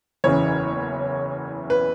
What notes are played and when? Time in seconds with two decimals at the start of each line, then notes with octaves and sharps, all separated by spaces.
0.24 F#1 E2 C#3 E3 C#5
1.70 B4